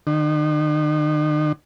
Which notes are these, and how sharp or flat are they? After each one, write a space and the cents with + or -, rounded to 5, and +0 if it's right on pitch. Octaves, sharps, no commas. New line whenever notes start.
D#3 -45